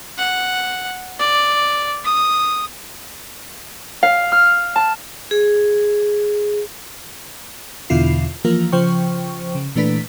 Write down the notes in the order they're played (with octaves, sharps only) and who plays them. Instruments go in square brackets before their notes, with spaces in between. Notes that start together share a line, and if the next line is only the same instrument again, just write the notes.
[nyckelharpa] F#5
D5
D#6
[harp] F5
F6
A5
[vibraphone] G#4
[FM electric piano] E2 B2 D3 E4 F4 C7
E3 F3 A#3 F4 A#4
C#3 F3 C5 G5 C#6
C#3
A#2 E3 A3 D4 B4 B6